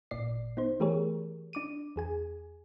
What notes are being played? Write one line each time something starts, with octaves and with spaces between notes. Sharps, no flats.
G#1 A#2 D5 C7
B3 D#4 C5
E3 A3 G4 G#4 A#4 C#5
D4 D6 D#7
E2 G#4 G#5